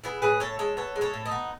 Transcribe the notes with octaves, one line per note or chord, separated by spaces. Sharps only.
B3 E4 G#4
A2 G#4 B4
A2 A4 C#5
G#3 A4 C#5
B3 A4 C#5
G#3
A4 C#5
A2
D#4
B3